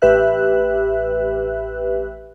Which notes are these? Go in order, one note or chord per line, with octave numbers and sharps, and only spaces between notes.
A1 G4 B4 E5 F#6